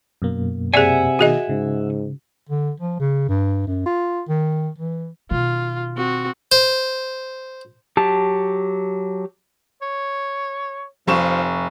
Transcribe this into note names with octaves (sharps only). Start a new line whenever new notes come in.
F#2 B2 A#3
C3 G#4 D5 E5 F#5 G#5
B2 D#3 F#4 G#4 D#5
G#2 C#3
D3
F3
C#3
G2
F#2
F4
D#3
E3
B2 D#3 F4
C4 F#4
C5
F#3 G4 A5
C#5
F1 F3 C#6 E7